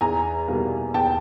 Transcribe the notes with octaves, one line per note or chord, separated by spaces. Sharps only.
E2 G#5 A#5
B2 G3 A#3
E2 G5 A5